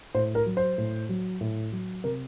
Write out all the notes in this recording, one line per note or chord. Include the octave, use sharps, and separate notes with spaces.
A2 C5
A#4
F#3
C5
A2
F#3
A2
F#3
C3 A#4